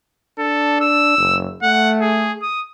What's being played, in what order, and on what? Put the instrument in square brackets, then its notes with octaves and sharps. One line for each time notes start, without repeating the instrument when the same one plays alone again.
[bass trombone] D4 [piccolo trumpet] A4
[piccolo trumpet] E6
[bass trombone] F#1
[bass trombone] A3 [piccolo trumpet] F#5
[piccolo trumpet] G#4
D#6